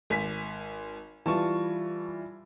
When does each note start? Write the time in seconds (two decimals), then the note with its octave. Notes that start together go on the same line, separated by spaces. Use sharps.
0.10 G#1 G#5 B6
1.26 E3 G3 F4 A5 C#6